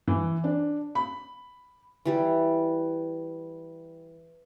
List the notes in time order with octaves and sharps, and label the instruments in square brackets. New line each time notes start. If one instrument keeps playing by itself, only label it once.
[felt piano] E3
D4
B5
[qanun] E3 G3